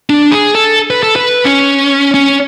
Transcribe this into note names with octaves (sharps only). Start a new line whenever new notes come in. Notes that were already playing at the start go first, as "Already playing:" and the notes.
D4
G#4
A4
B4
A4
B4
C#4
C#4